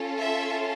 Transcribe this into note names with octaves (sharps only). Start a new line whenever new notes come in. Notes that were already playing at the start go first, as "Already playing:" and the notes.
Already playing: C#4 F4 A4
E5